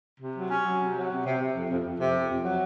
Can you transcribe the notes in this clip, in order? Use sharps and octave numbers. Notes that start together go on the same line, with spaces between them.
C3
F#3
C#4
F#3
C3
F#3
C3
C3
C3
F2
F2
F2
C3
F2
F2
F#3